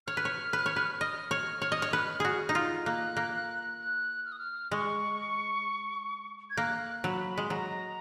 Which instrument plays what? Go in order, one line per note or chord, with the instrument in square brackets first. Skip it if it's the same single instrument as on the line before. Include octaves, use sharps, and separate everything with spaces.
[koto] C#5 [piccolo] F6
[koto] B4
C#5
B4
C#5
B4
[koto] D#5 [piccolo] F6
[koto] C#5
C#5
D#5
C#5
B4
F#4 G#4
D#4
F4
[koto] A#3 [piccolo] F#6
[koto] A#3
[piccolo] F#6
F#6
F6
D#6
F6
[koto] G#3 [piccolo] C#6
[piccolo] G#6
[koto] A#3 [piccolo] F#6
[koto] F#3 [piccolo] B5
[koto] G#3
[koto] F#3 [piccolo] A#5